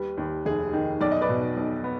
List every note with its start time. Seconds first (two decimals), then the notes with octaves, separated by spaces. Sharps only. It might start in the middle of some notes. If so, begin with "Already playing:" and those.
Already playing: D#2 G3 B4
0.17 D#2
0.46 F1 G#4
0.73 D#3
1.01 B1 D5
1.12 D#5
1.21 B4 D5
1.29 B2
1.57 B1
1.84 B3